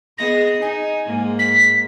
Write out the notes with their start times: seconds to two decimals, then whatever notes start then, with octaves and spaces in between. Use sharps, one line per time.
0.18 B3 G#4 D#5 A#6
0.61 D#4 G#5
1.06 G#2 A#3
1.39 B6